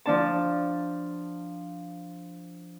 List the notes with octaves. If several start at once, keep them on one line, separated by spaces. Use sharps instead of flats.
F3 D4 A5